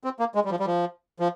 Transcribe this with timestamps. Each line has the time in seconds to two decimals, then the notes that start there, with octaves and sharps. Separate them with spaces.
0.04 C4
0.20 A#3
0.35 G#3
0.45 G3
0.51 F3
0.60 G3
0.66 F3
1.20 F3